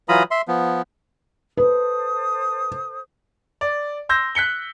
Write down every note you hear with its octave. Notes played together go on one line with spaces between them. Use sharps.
E3 F#3 F4 A#5 B5 D#6
E5 C6
F3 B3
A4 B4 C5 D#6
D5
C6 E6 G6 A#6
F#6 B6 C#7 G7